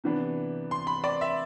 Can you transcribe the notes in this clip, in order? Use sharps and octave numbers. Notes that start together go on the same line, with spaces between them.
C3 E3 B3 D4
C6
B5
D5
E5